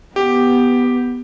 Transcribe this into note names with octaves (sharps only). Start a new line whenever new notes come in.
B3 G4